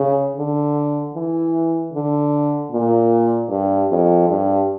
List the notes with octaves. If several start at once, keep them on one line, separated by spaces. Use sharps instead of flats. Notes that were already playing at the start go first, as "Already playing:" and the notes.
Already playing: C#3
D3
E3
D3
A#2
G2
F2
G2